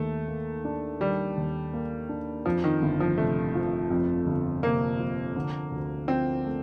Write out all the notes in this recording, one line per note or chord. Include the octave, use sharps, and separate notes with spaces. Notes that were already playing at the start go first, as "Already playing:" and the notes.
Already playing: D#2 D#3 A3
A#3
D4
D#3 G3
D#2
A#3
D4
F2 F3
D#3
G1
F3
C3 A3
F3
F2
G1
C3 A#3
F3
D3
D2
F3 C4
A3